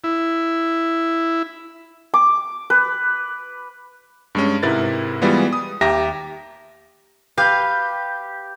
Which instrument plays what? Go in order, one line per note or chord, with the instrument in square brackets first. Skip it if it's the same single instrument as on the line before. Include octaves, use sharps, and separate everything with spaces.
[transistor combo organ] E4
[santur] D6
B4
[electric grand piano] G2 G#3 C#4
G#2 C3 E4 A#4 B4 A6
E3 G3 G#3 B3 F4
D#6
D#2 G4 E5 A#5 A#6
[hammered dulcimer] G4 [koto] B4 F5